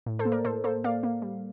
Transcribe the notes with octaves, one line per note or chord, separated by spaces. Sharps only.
A2
A4 C5
A#3
A#4 D5
A2 A4 C5
A#3 A4 C5
A#3 D5 F5
A#3
G3